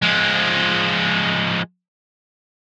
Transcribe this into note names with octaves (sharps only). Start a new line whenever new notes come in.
F3 G#3